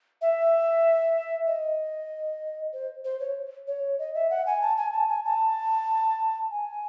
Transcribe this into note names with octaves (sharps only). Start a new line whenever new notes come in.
E5
D#5
C5
C5
C#5
C#5
D#5
E5
F#5
G#5
A5
G#5
A5
G#5
A5
G#5